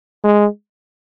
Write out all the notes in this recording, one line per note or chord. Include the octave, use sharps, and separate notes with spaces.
G#3